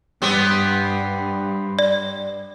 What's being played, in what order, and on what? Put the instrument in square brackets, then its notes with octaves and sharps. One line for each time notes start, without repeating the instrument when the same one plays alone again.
[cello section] G2 [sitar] B3 C4 G4
[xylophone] D5